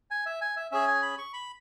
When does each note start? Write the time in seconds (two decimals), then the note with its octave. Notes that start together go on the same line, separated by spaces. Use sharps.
0.11 G#5
0.26 E5
0.41 G#5
0.57 E5
0.71 C#4 G#4 E5
0.88 G#5
1.02 B5
1.18 C#6
1.33 B5